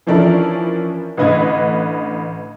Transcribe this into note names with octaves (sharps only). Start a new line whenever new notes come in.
E3 F3 C#4 D4 E4 A#4
A1 D3 B4 D#5 F#6 G#6